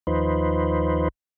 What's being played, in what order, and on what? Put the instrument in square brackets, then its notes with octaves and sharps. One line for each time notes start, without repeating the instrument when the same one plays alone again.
[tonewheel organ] D#2 F3 D#4 B4 C5